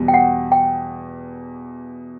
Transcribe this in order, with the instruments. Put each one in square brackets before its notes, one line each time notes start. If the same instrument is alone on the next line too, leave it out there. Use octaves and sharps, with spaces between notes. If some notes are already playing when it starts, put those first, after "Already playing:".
Already playing: [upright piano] E2 B2 G3
[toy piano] G5
F#5
G5